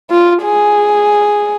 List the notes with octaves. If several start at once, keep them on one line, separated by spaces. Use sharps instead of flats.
F4
G#4